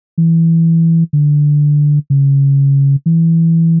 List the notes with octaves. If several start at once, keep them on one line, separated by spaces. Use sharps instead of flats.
E3
D3
C#3
E3